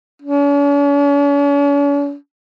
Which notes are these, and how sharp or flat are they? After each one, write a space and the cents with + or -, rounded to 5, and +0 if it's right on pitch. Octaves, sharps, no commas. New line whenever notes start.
C#4 +45